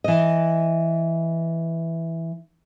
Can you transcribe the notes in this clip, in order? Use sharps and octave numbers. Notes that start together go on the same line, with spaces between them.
E3 D#5